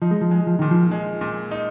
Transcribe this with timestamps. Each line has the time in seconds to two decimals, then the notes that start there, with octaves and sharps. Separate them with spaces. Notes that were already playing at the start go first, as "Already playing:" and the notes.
0.02 F3 D#4
0.11 G#3
0.21 F3
0.31 G#3
0.47 F3
0.59 A#2 D#3
0.71 F3
0.91 G#3
1.21 A#2
1.51 D#4